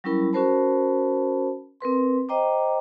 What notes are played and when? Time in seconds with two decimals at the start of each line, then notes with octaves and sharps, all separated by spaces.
0.04 F#3 G3 C#4 E4 A#4 B5
0.33 C#4 F#4 A#4 C5 A5 B5
1.81 C4 A#4 B4 C6
2.29 C5 D#5 G5 A#5 D6